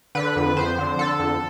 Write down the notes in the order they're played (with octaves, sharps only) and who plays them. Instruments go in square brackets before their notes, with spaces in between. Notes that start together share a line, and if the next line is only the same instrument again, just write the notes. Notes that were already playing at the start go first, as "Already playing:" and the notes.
[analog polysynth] D3 B4
F2
F2 C5
D3
D3 A4
F2